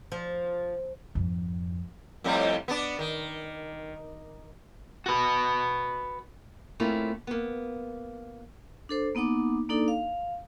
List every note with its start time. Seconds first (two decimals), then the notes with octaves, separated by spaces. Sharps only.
0.12 F3
1.15 F2 G#2
2.24 F2 A2 G3
2.68 B3 D4
2.99 D#3
5.06 F#4 B4
6.80 A3 A#3 C4 C#4 E4 F4
7.27 A#3 B3
8.89 D4 A4 C5
9.15 A#3 B3 D#4 F#5 D6
9.69 A#3 D4 D#4 A4 D5
9.88 F5